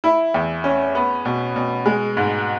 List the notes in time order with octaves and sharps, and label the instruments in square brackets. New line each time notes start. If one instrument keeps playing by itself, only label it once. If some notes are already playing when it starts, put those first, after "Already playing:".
[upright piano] E4
E2
C#4
B3
B2
B2
G#3
G#2